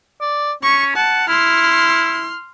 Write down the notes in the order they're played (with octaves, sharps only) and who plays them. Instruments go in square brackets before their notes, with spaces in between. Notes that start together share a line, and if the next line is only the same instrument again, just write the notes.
[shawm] D5
[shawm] C#4 [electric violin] C#6
[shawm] F#5 [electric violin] A5
[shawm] E4 [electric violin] C6 F6